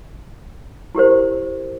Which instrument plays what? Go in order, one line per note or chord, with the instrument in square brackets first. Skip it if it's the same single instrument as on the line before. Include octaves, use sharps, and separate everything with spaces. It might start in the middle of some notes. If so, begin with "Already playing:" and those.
[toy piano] E4 G4 A#4 C5